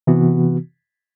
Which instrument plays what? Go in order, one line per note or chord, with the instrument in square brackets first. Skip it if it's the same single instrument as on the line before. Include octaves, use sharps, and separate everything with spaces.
[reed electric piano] C3 E3 B3 F#4